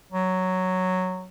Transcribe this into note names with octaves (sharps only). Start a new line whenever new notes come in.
F#3